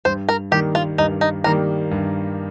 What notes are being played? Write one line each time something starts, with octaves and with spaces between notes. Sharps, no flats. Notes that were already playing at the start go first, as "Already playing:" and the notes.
G2 C5
A#4
D#3 G3 A#3 G4
F4
G2 D#4
D#4
D#3 G3 A#3 A#4
G2